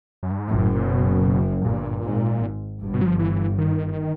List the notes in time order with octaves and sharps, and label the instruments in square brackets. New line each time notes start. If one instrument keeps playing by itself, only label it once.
[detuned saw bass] F#2
G2
G#2
[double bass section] F#1 F#2 [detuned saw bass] A2
[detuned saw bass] A#2
A2
A#2
B2
[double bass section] G1 G2 [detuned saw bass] A#2
[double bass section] G#1 G#2
G1 G2
[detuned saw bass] B2
F#3
F3
E3
D#3